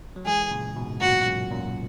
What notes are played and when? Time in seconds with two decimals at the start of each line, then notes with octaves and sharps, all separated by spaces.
0.16 F#3
0.26 E3 G#3 G#4
0.51 A#2 C#3
0.76 G#2 B2
1.01 F#2 A#2 F#4
1.26 F#2
1.51 F#2 A#2